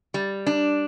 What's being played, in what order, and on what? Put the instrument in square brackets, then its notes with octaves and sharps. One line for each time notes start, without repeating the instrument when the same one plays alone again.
[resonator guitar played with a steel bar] G3
D4